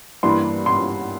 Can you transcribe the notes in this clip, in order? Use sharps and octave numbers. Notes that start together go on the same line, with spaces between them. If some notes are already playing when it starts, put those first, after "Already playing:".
G2 E3 G3 A#3 D4 C6
C6